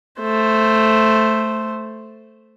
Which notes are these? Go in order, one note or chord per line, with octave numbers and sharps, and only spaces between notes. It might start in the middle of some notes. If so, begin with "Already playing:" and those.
A3 C5